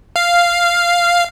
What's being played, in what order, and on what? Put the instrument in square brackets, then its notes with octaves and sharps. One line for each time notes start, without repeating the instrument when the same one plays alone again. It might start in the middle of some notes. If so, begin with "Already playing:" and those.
[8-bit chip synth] F5